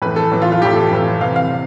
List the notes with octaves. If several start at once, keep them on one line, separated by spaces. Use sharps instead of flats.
A2 E3 B4
A4
A2 E3
F4
F4
A2 E3 G4
A4
A2 E3
C3 E3 F5
F5
C3